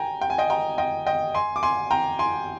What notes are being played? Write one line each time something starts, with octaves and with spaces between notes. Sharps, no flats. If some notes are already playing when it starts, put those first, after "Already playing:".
Already playing: G5 G#5 A#5
G5
G#5
D#5 G5
G5 A#5
D#5 G5
D#5 G5
G#5 C6
D6
G#5 C6
G5 A#5
G#5 C6